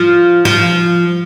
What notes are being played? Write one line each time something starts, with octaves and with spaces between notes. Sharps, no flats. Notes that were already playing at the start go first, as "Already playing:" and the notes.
Already playing: F3
F3